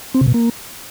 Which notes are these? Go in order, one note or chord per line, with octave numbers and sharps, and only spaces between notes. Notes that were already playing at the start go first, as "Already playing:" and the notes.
C4
C3
B2
A#3